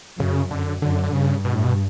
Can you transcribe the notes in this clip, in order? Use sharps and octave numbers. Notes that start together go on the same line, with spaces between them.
F#2 C#3
F#2 D3
F#2 D3
D3
G2 C#3
B2
A2
B2